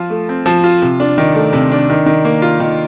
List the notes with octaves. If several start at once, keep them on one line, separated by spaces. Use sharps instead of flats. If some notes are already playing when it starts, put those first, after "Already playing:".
Already playing: F3 F4
A3
C4
F3
F4
C3
D4
D#3
A3
C3
D4
D#3
D#3
A#3
F4
D#3